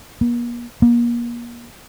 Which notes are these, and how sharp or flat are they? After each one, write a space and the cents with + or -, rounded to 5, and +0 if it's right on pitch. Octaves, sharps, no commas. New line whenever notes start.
A#3 +45
A#3 +35